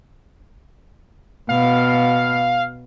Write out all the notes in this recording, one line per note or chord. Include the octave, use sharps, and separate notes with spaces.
B2 F5